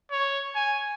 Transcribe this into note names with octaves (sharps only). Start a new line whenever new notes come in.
C#5
G#5